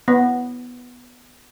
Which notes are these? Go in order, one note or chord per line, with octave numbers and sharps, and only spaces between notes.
B3